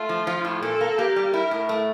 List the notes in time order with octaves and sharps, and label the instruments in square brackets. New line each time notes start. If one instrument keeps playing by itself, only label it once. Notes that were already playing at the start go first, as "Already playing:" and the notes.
Already playing: [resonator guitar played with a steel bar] A3 [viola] F4
[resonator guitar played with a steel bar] F3
F3
A2
[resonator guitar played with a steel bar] A#2 [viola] A4
[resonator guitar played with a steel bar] A#3
[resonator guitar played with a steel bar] A#3 [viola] G4
[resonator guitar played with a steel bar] G3
[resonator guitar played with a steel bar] E4 [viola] A#4
[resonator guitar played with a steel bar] A2
A3